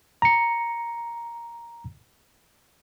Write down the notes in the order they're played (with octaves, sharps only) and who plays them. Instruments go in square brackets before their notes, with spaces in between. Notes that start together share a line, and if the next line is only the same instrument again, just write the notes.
[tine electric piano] A#5 C#7